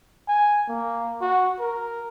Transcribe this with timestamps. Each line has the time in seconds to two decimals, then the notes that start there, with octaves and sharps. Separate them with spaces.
0.28 G#5
0.69 A#3
1.21 F#4
1.60 A#4